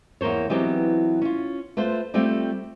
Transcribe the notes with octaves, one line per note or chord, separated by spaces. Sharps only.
E2 A#3 A#4 C5 C#5
E3 F#3 B3 C4 D#4 G4
C#4 F4
A3 F4 B4 C5
G3 A3 C4 F4 G4